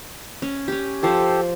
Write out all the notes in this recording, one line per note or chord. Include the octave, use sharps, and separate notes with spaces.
C#4
C#4 G4
F3 G4 A4 C5 A5